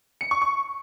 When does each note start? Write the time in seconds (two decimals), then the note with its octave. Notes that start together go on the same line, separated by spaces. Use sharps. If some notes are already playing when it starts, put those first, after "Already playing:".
0.21 C#7
0.31 C#6
0.42 C#6